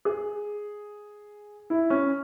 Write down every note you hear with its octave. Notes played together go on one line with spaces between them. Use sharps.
G#4
E4
C#4